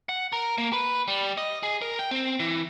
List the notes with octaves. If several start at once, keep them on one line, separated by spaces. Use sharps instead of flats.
F#5
A#4
A#3
B4
G3
D#5
G#4
A#4
G5
C4
E3